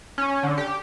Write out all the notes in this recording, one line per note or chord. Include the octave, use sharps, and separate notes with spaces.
C#4
D3
G4